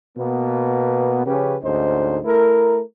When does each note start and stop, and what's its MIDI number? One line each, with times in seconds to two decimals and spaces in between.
0.17 1.22 47
0.17 1.22 58
0.17 1.22 59
1.25 1.56 49
1.25 1.56 53
1.25 1.56 61
1.25 1.56 67
1.25 1.56 71
1.63 2.19 38
1.63 2.19 44
1.63 2.19 61
1.63 2.19 63
1.63 2.19 72
2.25 2.80 57
2.25 2.80 64
2.25 2.80 70